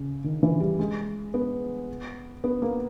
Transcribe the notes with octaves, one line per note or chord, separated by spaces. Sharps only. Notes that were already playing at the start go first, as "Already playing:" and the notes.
Already playing: C#3
D#3
E3
G3
G#3
B3
B3
A#3